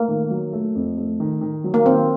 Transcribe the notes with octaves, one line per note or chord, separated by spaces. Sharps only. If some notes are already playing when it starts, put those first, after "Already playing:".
Already playing: A3 A#3
D#3
F#3
A3
F2
A3
D#3
D#3
F#3
A#3
D#3 C4